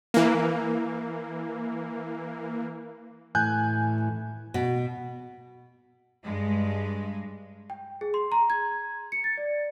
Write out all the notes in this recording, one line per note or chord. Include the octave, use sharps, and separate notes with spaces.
E3 A#3
A2 E3 G#5 F#6 G6
B2
G2 G#3
G5
G#4
C6
A#5
G#6
C#7
A6
D5